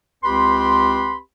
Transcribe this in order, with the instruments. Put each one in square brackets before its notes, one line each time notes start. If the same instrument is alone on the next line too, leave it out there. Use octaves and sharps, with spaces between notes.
[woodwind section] C#2 C4 G4 B4 B5 C6